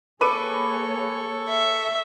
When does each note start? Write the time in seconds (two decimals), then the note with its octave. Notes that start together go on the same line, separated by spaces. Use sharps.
0.21 A#3 G#4 A4 B4 C#5 C#6 D6 D#7
1.48 E5